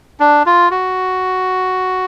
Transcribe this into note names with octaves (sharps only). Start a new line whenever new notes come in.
D4
F4
F#4